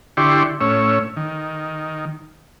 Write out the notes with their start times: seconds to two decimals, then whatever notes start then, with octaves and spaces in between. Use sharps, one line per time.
0.17 D3 E4 G4 D5 C6 C#6
0.61 A2 C#4 C#5 E6
1.17 D#3